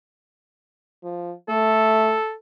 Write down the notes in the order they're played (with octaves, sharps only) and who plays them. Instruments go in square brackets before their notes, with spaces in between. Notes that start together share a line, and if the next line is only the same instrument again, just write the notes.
[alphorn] F3
[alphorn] A3 [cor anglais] A4